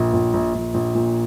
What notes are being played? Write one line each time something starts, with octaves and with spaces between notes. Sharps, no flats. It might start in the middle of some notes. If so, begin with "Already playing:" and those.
Already playing: A#1 A#2
A#1
A#1
A#1
A#1
A#2